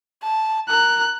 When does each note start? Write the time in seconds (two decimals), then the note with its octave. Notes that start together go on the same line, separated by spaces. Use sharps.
0.22 A5
0.69 A#4 F#6